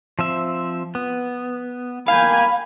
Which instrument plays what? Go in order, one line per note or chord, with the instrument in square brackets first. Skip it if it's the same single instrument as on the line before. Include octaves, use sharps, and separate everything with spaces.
[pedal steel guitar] F3 C4 E5
B3
[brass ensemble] A#3 G5 G#5 [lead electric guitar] F5 [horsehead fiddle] B5